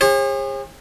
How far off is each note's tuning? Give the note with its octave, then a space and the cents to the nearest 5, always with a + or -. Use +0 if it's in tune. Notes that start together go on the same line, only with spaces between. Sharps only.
G#4 -45 C#5 -45